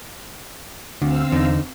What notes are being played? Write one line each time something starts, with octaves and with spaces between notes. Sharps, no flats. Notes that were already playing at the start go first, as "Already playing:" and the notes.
D2 D3 C4 F5 E6
E2 D3 D#4